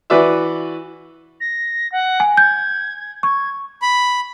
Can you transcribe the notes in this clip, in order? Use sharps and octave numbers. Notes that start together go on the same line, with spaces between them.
E3 F#4 B4 D5 E5
A#6
F#5
G#5
G6 G#6
C#6 G#6
B5